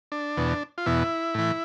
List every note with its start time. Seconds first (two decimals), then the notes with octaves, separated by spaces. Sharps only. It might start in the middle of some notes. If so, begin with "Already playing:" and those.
0.12 D4
0.37 E2 B2
0.78 F4
0.86 E2 B2 E4
1.34 A2 E3